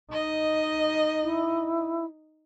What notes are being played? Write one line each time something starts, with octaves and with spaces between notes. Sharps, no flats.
D#4 D#5
E4